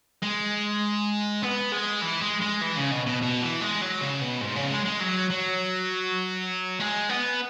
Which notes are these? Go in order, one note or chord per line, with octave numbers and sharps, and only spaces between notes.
G#3
B3
G#3
E3
G#3
G#3
E3
C#3
B2
B2
B2
E3
G#3
F#3
C#3
B2
G#2
C#3
G#3
G#3
F#3
F#3
G#3
B3